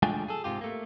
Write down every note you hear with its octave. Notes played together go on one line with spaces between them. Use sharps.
G#3 A3 D4 F4 G5 G#5
G#4 A4
G#2 C3 F4 G4
A3 A#3